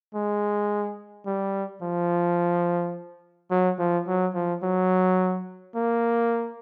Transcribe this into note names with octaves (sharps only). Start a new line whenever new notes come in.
G#3
G3
F3
F#3
F3
F#3
F3
F#3
A#3